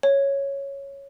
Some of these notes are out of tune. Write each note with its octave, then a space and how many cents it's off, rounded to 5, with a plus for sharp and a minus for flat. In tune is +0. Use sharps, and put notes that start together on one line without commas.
C#5 +0